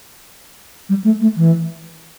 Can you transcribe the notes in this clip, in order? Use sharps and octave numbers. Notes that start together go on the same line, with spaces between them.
G3
A3
A3
E3